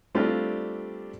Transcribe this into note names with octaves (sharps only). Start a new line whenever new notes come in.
G3 A3 C4 D4 F4 G4